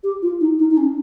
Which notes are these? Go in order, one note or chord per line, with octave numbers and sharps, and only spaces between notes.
G4
F4
D#4
D#4
D#4
C#4